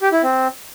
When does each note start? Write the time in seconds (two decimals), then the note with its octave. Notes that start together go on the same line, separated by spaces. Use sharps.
0.02 G4
0.12 E4
0.23 C4